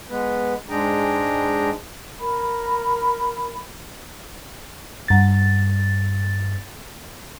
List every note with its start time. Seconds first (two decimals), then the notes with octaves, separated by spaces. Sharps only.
0.10 G#3 B3 B4
0.69 G#2 G#3 D4 G#4 G5 A#5
2.21 A#4 B5
5.08 G2 A6